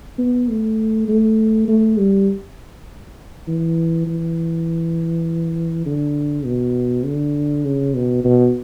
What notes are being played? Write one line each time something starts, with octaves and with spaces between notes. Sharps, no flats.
B3
A3
A3
A3
G3
E3
E3
D3
B2
D3
C#3
B2
B2